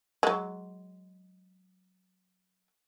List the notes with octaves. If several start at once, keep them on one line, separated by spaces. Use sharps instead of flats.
F#3 G#3